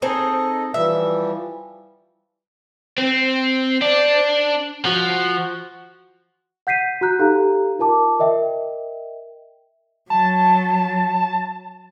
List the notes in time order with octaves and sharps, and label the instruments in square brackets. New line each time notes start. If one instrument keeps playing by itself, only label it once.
[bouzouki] C4 D#4 G#4 [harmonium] A4 D#5
[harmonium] E3 F3 G3 [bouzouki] E5
[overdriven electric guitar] C4 [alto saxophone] C5
[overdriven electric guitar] D4
[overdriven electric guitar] F3 [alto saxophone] F#4
[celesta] F#5 G6 B6 C7 D#7
F#4 A#5 F#6 G6
D#4 G4 A4 F5 A#5
F4 A#4 A5 D6
A#4 D#5 E5 G5
[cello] F#3 [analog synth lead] A5